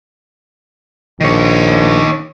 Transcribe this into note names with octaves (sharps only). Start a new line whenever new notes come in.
A#1 D#3 C#5